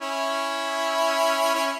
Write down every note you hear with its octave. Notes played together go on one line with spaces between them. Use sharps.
C#4 E4
C#4 E4